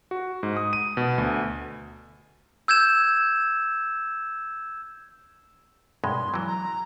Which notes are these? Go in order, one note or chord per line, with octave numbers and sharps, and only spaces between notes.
F#4
G#2
D#6
D#7
B2
D2
E6 G6 G#6 E7
G2 B2 G#3 C6
E3 F#3
A#5